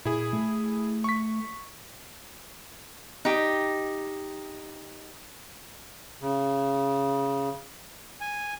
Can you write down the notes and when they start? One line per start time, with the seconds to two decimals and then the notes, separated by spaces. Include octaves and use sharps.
0.05 A#2 E4 G#4
0.33 A3
1.04 C#6 B6
3.25 D#4 G4
6.21 C#3
8.21 G#5